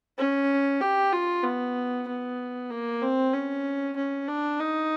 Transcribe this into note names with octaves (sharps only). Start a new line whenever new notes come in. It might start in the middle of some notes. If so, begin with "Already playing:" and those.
C#4
G4
F4
B3
B3
A#3
C4
C#4
C#4
D4
D#4